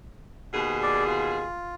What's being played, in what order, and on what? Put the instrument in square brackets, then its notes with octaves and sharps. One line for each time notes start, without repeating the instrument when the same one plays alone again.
[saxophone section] D#2 B2 G#4
[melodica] D5
F4